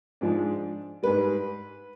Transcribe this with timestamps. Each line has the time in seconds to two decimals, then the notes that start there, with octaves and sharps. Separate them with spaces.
0.21 G#2 F3 G#3 D4
1.03 G#2 G3 B4